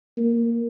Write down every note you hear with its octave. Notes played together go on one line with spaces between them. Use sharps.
A#3